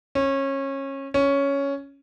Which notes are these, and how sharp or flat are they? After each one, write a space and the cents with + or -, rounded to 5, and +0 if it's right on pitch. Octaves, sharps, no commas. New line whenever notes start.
C#4 -25
C#4 +5